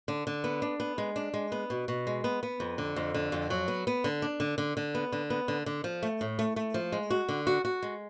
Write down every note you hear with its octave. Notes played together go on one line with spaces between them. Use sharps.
D3
D3
B3
D4
B3
G#3
D4
G#3
B3
B2
B2
G#3
B3
B3
F2
D3
F2
D3
F2
F#3
B3
B3
D3
D4
D3
D3
D3
B3
D3
B3
D3
D3
F3
A3
A2
A3
A3
F3
G#3
F#4
D3
F#4
F#4
G#3